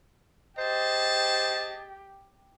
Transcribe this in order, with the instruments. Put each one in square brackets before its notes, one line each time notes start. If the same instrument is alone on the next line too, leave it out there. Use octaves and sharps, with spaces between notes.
[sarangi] G4 [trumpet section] G#4 A5 [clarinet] C5 [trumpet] D#5